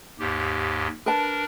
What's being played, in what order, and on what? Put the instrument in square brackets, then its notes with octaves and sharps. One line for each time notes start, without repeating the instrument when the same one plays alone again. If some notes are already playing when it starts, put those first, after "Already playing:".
[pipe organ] D#2 G#2 G4
[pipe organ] D4 A#4 [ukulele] B4 A5